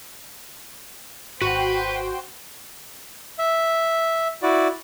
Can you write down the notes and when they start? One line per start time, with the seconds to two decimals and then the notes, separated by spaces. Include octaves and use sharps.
1.41 G#1 F#4 B4 C5 G5
3.39 E5
4.43 E4 F#4 D5